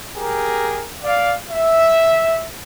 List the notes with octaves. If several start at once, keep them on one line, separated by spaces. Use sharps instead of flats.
G4 G#4 A#4
D5 F5
E5